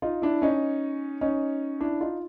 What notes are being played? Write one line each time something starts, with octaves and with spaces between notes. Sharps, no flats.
D#4 F4
D4 E4
C#4 D#4
C#4 D#4
D4 E4
D#4 F4